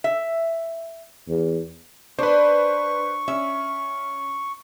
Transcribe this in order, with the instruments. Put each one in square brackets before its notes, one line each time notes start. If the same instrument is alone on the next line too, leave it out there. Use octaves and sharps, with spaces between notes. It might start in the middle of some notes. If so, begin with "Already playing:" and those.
[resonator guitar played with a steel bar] E5
[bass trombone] E2
[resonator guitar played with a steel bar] D4 [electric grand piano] B4 C5 [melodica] C#6
[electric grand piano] C#4 [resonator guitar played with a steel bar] E5